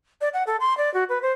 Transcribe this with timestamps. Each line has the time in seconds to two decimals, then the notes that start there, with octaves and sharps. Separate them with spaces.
0.21 D5
0.34 F#5
0.47 A4
0.60 C6
0.78 D5
0.94 F#4
1.09 B4
1.22 C5